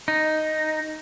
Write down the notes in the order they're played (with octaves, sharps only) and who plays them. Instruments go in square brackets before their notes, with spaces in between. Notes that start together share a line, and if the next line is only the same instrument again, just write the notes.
[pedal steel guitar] D#4